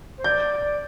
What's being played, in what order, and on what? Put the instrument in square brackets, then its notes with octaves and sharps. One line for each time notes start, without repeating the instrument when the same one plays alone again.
[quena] C5
[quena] D5 [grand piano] G6